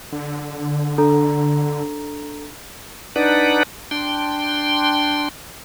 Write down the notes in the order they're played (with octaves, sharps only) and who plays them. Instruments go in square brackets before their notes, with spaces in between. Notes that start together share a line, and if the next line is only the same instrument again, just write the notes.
[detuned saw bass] D3
[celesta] D4 A4 A#5
[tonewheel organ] D4 D#4 B4 D5 F#5
D4 G5 C6